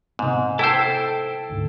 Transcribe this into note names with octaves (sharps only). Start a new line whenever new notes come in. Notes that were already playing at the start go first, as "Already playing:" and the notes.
G#2 C3 B3
E4 A4 C5 G5 E6
D2 G#2